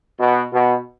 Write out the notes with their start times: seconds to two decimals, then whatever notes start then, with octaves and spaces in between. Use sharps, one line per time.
0.19 B2
0.51 B2